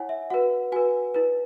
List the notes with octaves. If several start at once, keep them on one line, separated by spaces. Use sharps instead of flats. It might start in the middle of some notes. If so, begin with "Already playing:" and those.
Already playing: E4 C#5 F#5 G#5
E5
F#4 B4 F#5
F#4 B4 G#5
E4 B4